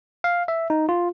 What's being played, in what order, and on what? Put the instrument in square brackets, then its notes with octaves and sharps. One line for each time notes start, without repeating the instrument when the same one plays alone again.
[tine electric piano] F5
E5
D#4
F4